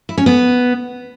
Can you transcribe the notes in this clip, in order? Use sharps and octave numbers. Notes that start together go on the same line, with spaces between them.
E4
C#4
B3